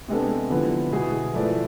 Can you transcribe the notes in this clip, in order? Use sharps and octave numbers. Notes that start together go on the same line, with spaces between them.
C3 G#3 B3 D4 A4
D3 F3 B3 E4
B2 G#3 B3 E4 G#4
F3 A3 E4 B4 D5